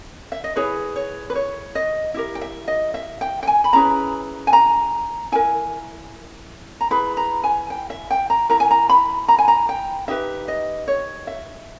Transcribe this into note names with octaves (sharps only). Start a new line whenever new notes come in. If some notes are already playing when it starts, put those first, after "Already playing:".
E5
D#5
E4 G#4 B4 C#5
C#5
B4
C#5
D#5
E4 G4 A#4 E5
G5
E5
D#5
E5
G5
G5
G#5
B5
C#4 E4 G#4 B4 A#5
G#5
A#5
E4 A#4 G#5
A#5
E4 G#4 B4 B5
A#5
G#5
G5
E5
G5
A#5
E4 A#4 A#5
G#5
A#5
B5
A#5
G#5
A#5
G5
D#4 G4 B4 E5
D#5
C#5
E5